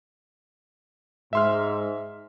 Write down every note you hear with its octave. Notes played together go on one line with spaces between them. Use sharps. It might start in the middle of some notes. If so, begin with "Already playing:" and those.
G#2 E5 C6 F6